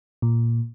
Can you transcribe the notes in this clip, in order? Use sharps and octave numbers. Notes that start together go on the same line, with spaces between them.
A#2